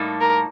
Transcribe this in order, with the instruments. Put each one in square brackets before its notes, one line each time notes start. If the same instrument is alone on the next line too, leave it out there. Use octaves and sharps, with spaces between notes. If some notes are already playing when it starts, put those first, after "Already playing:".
Already playing: [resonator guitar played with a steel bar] A2 G3 A#3 D#4 A4
[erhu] A#4